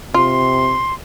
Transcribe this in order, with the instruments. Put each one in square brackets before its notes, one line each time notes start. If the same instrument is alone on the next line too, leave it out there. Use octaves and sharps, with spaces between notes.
[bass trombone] C3 [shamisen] F4 [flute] C6